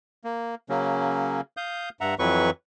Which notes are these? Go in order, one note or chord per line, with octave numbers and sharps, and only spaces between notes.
A#3
C#3 F#3 A#3 C#4
F5 D#6 G6
G2 E5 F#5 A#5
F2 E3 F#3 B4 C#6